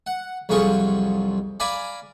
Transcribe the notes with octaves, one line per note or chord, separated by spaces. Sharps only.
F#5
C2 F2 F#3 F4 G#4 C#6
D5 F5 G#5 A#5 B5 D6